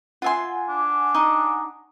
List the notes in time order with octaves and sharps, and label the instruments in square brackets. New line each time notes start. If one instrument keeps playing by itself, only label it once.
[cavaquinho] F4 E5 C6 [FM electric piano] F#5 G#5
[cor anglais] D4
[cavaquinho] D#4 D#5 C#6